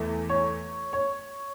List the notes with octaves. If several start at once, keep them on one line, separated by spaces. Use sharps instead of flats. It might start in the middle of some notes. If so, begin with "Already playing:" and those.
Already playing: E2 E3 A3
C#5
C#5